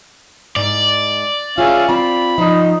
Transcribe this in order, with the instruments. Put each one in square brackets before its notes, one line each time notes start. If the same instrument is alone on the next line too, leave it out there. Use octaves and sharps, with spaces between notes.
[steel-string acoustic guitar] G#2 [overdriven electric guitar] D5
[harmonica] C#4 E5 F5 [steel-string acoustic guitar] F4 G#4
[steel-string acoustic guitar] C4 F4 [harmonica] B5
[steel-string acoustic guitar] F3 [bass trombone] D#4